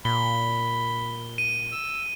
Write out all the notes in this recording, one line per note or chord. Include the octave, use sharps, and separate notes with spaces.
A#2 B5 G7
D#7
E6